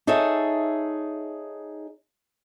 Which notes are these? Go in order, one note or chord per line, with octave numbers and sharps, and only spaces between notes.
D#4 G#4 A4 C#5 E5